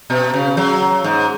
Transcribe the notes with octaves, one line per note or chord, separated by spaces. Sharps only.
B2
C#3
F#3
G#2